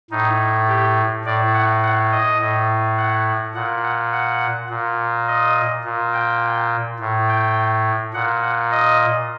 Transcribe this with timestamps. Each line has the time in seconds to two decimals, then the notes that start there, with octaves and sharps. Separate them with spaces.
0.11 A2 D#4
0.68 G4
1.25 A2 D5
1.54 F#5
1.83 F#5
2.12 D#5
2.40 A2
2.98 F#5
3.55 A#2 F#5
3.84 F#5
4.13 F#5
4.70 A#2
5.27 D#5
5.85 A#2
6.13 G5
7.00 A2
7.28 G5
8.14 A#2 F#5
8.43 F#5
8.71 D#5